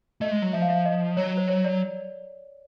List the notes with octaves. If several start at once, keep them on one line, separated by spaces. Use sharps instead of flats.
A3 D#5
G#3
F#3
F3 E5
F5
E5
D#5
F#3 C#5
C5
C#5
D5